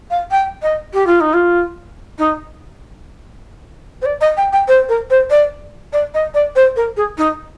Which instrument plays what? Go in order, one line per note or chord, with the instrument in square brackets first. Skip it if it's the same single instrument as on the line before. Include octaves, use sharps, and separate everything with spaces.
[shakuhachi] F5
G5
D#5
G4
F4
D#4
F4
D#4
C5
D5
D#5
G5
G5
C5
A#4
C5
D5
D5
D#5
D5
C5
A#4
G#4
D#4